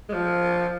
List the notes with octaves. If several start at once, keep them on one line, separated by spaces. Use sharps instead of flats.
G#3
F3